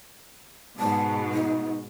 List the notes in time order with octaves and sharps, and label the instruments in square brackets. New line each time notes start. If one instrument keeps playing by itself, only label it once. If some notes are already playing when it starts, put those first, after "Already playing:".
[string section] G#2 B2 [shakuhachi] A5
[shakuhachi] D#4